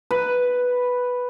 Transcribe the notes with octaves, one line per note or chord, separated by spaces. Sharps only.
B4